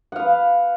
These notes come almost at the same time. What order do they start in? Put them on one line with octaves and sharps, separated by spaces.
F#5 F5 B4